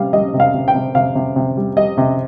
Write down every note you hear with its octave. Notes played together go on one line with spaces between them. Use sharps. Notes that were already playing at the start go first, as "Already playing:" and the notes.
Already playing: C3 G3 F5
G3 D#5
C3
F5
C3
G5
C3
C3 F5
C3
C3
G3
G3 D#5
C3